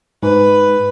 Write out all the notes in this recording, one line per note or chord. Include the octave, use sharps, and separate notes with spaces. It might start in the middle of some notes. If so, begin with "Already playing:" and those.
G#2 B4